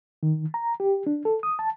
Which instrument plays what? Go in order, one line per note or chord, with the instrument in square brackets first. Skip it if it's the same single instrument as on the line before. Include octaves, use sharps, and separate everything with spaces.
[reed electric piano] D#3
A#5
G4
D4
A4
D#6
A5